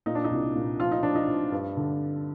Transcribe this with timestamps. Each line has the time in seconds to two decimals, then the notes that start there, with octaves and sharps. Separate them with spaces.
0.06 A#2 D#4
0.15 D4
0.24 D#4
0.31 C2
0.55 A#2
0.79 F3 F4
0.91 D#4
1.03 F3 D4
1.15 D#4
1.28 F3
1.52 G2
1.77 D3